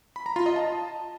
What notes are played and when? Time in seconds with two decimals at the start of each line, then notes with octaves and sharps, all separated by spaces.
0.16 B5
0.26 A#5
0.36 F4
0.46 D#5
0.56 A5